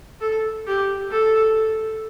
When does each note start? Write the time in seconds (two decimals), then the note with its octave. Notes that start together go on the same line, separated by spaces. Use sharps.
0.21 A4
0.67 G4
1.11 A4